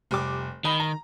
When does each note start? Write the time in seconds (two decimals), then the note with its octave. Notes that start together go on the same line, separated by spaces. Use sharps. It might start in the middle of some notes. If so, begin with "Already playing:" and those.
0.11 F1 G3 D6
0.65 D#3 D#5 B5
0.80 A#5